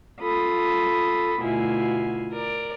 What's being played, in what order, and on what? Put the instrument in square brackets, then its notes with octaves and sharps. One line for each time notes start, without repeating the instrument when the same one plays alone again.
[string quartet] F4 A4 B5 D#6
D2 B2 E4 F4 G#5
A#4 D5